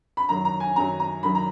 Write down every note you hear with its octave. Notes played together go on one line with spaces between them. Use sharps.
B5
F#2 D#3 F#3 A#5
A#5
G#5
F#2 D#3 F#3 A#5
A#5
F#2 D#3 F#3 B5
A#5